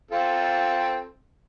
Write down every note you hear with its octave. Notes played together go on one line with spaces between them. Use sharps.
C4 F4 A4